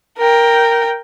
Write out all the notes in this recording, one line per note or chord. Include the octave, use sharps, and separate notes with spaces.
A#4 G5